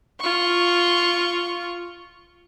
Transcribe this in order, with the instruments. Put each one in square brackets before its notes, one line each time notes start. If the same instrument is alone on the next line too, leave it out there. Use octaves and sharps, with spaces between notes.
[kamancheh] F4 C#6